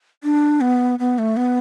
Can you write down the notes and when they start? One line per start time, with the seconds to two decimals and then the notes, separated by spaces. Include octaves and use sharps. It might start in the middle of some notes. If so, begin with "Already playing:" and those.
0.23 D4
0.61 B3
0.99 B3
1.18 A3
1.37 B3